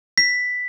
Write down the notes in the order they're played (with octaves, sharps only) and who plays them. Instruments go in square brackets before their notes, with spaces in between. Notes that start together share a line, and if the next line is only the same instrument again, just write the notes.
[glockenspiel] B6